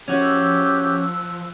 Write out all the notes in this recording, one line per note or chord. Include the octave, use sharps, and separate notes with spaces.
F3 C#4 F#4 G4 E6 F#6